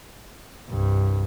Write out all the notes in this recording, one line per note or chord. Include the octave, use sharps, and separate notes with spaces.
C2 G2